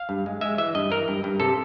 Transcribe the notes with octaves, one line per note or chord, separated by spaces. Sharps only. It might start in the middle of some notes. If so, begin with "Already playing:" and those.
Already playing: F5
G2
G#3
G#3 E5
E3 E5
G2 D#5
E3 A#4
G2
G2
C3 A4